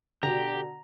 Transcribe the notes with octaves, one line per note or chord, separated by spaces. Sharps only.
B2 D3 G4 A#5